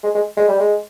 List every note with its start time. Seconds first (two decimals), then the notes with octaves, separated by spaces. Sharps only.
0.04 G#3
0.15 G#3
0.37 G#3
0.48 G3
0.60 G#3